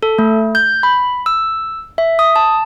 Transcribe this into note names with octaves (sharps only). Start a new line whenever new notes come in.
A4
A3
G6
B5
E6
E5
D#6
A5